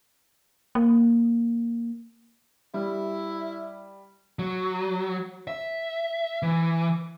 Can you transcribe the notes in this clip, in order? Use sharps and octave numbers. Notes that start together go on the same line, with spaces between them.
A#3
G3 E4
F#3
E5
E3